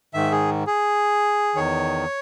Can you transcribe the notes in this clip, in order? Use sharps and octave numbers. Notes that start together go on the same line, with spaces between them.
G#2 D#3 E5
G#4
G#4
E2 D#3 C#5